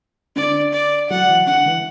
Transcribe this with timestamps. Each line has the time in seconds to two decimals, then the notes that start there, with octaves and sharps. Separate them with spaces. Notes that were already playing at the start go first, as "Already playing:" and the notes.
0.36 D3 D5
0.73 D5
1.10 F#3 F#5
1.29 E3
1.47 D3 F#5
1.66 E3